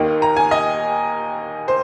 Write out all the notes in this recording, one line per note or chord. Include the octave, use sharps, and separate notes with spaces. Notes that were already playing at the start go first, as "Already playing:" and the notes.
Already playing: D#2 D#3 A#3 D#4
A#5
G#5
D#5
C5